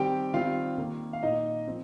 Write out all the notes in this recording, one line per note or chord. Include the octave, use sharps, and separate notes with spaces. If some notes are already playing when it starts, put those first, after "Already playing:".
Already playing: D#3 G3 C4 G4 G5
D#3 G3 C4 F4 F5
D#3 A#3
F5
A#2 A#3 D#4 D#5
F3 C4